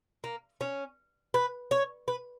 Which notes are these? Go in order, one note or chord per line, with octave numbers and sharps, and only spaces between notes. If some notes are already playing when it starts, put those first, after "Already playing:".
A#3
C#4
B4
C#5
B4